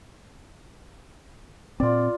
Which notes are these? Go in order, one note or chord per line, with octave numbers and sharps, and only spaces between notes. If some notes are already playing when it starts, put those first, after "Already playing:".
A#2 C4 F4 D5